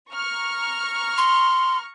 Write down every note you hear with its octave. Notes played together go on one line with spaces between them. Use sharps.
A#5 C#6 F6
C6